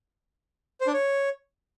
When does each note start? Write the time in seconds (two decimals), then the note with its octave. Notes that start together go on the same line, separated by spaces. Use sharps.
0.81 C5
0.87 D4
0.93 C#5